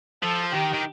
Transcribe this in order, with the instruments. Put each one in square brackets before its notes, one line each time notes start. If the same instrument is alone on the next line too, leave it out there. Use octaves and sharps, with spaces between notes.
[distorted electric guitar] F3 [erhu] A4
[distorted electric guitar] D#3 [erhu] G4
[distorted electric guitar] D#3